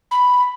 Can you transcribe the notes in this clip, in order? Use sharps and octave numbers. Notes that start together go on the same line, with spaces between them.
B5